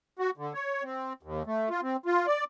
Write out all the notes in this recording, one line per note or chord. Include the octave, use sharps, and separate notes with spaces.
F#4
D3
C#5
C4
D#2
A3
F4
C4
F4
D5